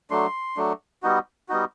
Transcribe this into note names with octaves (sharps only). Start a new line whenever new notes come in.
F#3 A3 D4 C6
F#3 A3 D4
G3 B3 D#4 F#4
G3 B3 D#4 F#4